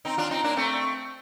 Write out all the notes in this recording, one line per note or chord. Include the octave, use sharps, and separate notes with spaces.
C4 D#4
D4 F4
C4 D#4
A#3 D4
A3 C4